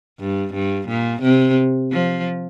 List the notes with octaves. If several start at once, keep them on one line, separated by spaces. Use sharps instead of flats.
G2
G2
A#2
C3
F3